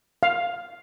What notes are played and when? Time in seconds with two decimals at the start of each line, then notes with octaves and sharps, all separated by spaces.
0.23 F5